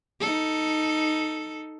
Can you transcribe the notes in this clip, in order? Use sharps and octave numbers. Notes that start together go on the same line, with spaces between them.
D#4 A4